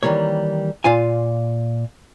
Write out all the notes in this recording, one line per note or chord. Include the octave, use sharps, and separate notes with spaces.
D#3 E3 G3 A#3 C#5
A#2 F4 F5 G#5